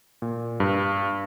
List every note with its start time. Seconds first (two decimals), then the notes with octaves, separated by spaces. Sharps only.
0.22 A#2
0.60 G2